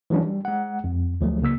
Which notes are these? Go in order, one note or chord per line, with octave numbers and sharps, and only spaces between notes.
E3 F#3 G#3 C#4 D4
G3
G#3 F#5
F2
D2 F3 F#3 A3
C#2 C#3 A#3 E6 B6